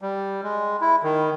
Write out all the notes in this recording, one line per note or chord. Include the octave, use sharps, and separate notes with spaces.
G3
G#3
E4
D#3